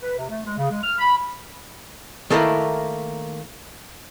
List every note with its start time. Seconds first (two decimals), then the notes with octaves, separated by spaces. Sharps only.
0.02 B4
0.18 C3
0.30 A3
0.46 G#3
0.58 C#3
0.71 G#3
0.84 F6
0.99 B5
2.30 D#3 A3 A#3 E4 A#4 B4